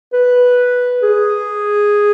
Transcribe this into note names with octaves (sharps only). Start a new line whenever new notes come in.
B4
G#4